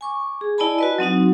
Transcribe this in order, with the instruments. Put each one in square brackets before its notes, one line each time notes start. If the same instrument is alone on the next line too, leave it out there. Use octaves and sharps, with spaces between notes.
[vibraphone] G#5 C#6 D6
G#4
E4 D5 D#5 G#5 A5 B5
F#4 B4 D#5
F#3 C4 D#4 F#4